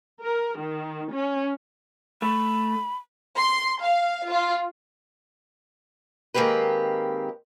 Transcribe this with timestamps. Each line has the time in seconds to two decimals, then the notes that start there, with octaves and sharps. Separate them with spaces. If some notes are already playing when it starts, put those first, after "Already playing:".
0.21 A#4
0.58 D#3
1.11 C#4
2.22 A3 B5
3.38 C6
3.81 F5
4.27 F4
6.34 D#3 G#3 A#3 C4 G4 B4